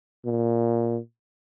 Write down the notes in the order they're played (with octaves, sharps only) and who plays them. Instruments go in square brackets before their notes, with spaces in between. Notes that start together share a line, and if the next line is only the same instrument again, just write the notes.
[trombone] A#2